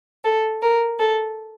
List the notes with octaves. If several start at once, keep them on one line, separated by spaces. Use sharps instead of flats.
A4
A#4
A4